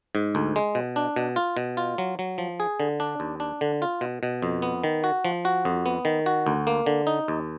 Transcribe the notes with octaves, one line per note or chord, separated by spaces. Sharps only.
G#2
D2
G#3
B2
D4
B2
F4
B2
F4
F#3
F#3
F3
G#4
D3
D4
D#2
D4
D3
F4
B2
B2
F2
B3
D#3
F#4
F3
F#4
F2
B3
D#3
F#4
D2
A#3
D3
D#4
D#2